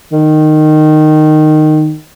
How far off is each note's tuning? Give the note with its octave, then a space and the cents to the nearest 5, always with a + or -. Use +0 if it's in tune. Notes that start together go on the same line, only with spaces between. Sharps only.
D#3 -15